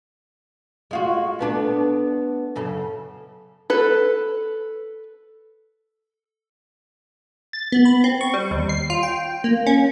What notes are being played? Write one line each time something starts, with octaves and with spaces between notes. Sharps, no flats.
G#3 F4 F#4
A3 B3 D4
F#2 C#3 A4
A4 B4
A6
B3
B5
C4
C#6
G3
D#2
C7
F4
G5
A#3
C#4